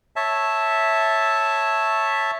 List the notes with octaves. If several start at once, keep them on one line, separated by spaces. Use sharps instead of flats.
C#5 E5 A5